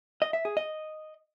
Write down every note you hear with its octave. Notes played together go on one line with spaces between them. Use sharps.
D#5
E5
G#4
D#5